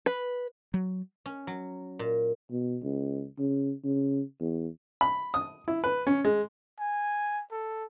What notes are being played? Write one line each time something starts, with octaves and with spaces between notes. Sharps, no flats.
B4
F#3
C#4
F#3
A#2
B2
C#2
C#3
C#3
E2
B5
D#6
E4
B4
C#4
G#3
G#5
A4